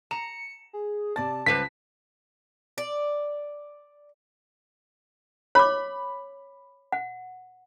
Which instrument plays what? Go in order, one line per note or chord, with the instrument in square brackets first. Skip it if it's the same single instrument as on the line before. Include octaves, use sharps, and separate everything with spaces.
[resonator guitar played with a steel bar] A#5 [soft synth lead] C#7 [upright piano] E7
[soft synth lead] G#4
[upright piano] C3 D5 A6 [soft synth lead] A5
[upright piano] C#2 [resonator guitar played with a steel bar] G3 B4 C5 [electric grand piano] B6
[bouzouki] D5
[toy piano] C#5 D6 [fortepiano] B5
[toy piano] F#5